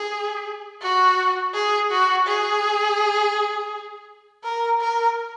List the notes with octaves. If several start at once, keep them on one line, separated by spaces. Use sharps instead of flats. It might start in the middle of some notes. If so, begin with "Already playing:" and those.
Already playing: G#4
F#4
G#4
F#4
G#4
A#4
A#4